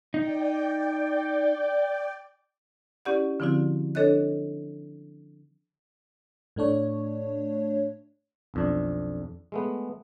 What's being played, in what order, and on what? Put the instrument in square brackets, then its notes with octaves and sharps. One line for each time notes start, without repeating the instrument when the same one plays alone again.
[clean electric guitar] D#4 [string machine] D5 G5
[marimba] C#4 E4 G4 D5 F#5
D3 F3 C4 E4 F#4
D4 A4 C#5 D#5 F#6
[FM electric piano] A2 A3 D4 C#5
[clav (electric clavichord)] B1 F2 D4
G#3 A3 B3